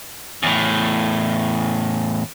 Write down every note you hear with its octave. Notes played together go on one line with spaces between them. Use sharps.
E2 A2